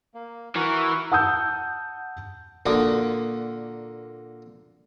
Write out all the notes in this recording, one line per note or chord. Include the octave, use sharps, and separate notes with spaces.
A#3
E3 F#4 A#4 C#6
F#5 A5 D#6 E6 G6
A#2 D3 A#3 F#4 D6 D#6